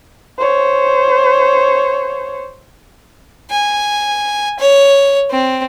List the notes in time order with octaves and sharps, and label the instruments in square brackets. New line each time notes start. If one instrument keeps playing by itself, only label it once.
[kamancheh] C5 C#5
[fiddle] G#5
C#5
C4